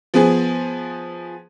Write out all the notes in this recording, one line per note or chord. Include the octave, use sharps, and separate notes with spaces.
F3 B3 G#4